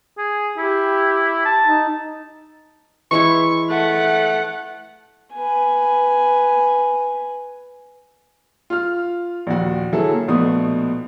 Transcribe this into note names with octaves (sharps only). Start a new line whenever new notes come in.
G#4
E4 G4
A5
D#4
E3 G#3 E4 C#6
A3 F#5
B4 G#5
F4 F6
A#1 D#2 F#4
D3 F#3 E4 G#4 A4
A#3
A#1 B2 A3 B3 D#4 D#6